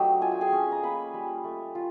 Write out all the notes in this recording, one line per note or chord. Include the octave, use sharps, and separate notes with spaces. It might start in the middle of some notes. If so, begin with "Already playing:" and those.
Already playing: F#3 A3 D4 G4 D#5 G5
F4 G#5
G5
G#4 G#5
C#4
A#5
A#3 B4 B5
G3
A3
F4